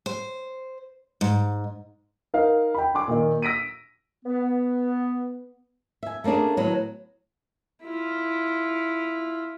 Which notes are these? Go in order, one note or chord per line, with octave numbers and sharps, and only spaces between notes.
C5
G#2
D#4 A#4 F5
G5 B5
G#5 C6 D6
A#2 D#3
E6 A#6 B6 D7 D#7
B3
E5 G#5
A3 A#3 C#4 D4 G#4
A2 D#3 F#3 B3
E4 F4